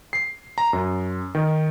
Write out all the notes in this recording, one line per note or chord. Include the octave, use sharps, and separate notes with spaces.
C7
A#5
F#2
D#3